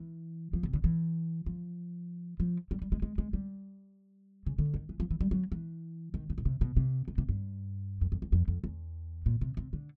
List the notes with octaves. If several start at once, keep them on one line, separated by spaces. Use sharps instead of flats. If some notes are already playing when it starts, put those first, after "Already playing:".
Already playing: E3
F3
C3
D3
E3
F3
F3
G3
G3
G#3
G#3
G#3
G3
C#3
D3
D#3
E3
F3
E3
G3
F#3
E3
D#3
C#3
B2
C3
B2
C3
C3
C3
G2
F#2
F2
E2
F2
F2
E2
A#2
C3
C3
D3